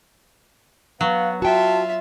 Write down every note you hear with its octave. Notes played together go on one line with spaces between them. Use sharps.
F#3 B3 F5
F4 F#4 E5 G5 A5